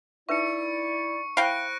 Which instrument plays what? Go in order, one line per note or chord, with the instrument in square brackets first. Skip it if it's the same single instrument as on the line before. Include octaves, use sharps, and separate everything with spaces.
[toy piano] D#4 B4 E5 [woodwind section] E4 D5 [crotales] C#6 C#7
[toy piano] E4 C5 B5 [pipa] F5 G5 [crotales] F#6 A#6 D7